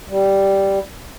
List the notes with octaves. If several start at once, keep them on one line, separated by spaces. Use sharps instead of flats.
G3